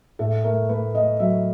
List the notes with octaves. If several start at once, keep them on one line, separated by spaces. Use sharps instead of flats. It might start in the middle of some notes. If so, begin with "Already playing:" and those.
A2 A4
A3 A#4
A3 B4
A3 D#5
F#3 E5